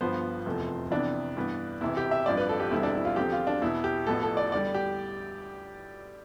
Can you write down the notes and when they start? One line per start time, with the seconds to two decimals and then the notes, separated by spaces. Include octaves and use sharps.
0.01 G1 G2 F3 B3 C5
0.46 F1 E2 C3 F3 A3
0.91 F2 C3 E3 B3 D4
1.36 G2 E3 B3
1.81 E1 E2 C3 E3 E4
1.97 G4
2.11 E5
2.26 A1 G2 F3 C4 D5
2.37 B4
2.49 A4
2.60 G4
2.71 E1 E2 D3 G3 C4 E4
2.83 D4
2.95 E4
3.05 F4
3.16 E2 D3 F3 C4 G4
3.32 F4
3.47 D4
3.61 E2 B2 B3 E4
3.84 G4
4.06 A1 A2 F3 B3 A4
4.23 A4
4.37 D5
4.52 E2 D3 G3 D5
4.74 G4